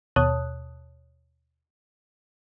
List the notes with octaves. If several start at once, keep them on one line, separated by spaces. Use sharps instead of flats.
D#2 B2 C#5 A5 D#6 F#6